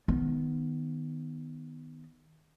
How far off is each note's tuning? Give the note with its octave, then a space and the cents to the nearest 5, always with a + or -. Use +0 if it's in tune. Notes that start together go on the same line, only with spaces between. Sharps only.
D#3 +0 B3 +0